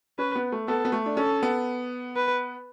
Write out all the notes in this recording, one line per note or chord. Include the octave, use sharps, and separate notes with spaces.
C#4 B4
B3
A3
B3 A4
B3
A3
D4
C#4 A4
B3
B4